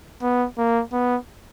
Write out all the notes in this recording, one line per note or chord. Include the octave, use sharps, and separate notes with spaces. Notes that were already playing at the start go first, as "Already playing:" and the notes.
B3
A#3
B3